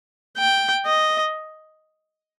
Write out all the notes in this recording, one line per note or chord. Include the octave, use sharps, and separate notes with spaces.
G5
D#5